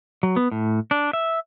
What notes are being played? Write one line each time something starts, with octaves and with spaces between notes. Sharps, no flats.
F#3
B3
A2
D4
E5